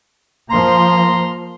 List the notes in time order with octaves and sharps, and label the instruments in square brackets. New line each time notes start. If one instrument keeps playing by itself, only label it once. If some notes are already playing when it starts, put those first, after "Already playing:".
[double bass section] F3 A#3 [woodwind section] A#5 C6